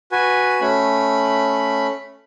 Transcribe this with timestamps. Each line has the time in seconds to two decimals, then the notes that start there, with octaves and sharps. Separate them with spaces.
0.12 F#4 B4 G#5
0.61 A3 C#4 B5